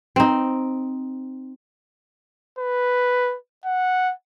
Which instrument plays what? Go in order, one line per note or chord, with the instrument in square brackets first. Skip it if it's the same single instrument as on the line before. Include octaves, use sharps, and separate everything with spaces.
[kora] C4 D#4
[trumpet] B4
F#5